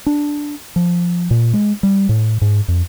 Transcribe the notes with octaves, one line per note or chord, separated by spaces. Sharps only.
D4
F3
A#2
G#3
G3
A2
G#2
F2